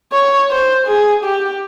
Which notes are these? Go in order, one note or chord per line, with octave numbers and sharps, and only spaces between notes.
C#5
C5
G#4
G4